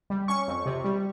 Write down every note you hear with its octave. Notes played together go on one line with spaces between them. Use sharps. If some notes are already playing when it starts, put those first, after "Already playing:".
G3
C#4 C#6
F2
C3
G3